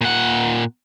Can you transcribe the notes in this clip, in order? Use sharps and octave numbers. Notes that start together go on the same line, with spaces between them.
A#2 F#5